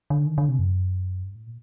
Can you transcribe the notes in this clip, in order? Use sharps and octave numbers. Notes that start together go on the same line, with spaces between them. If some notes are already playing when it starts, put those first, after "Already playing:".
D3
D#3
D3
C3
F#2
G2
A2
A#2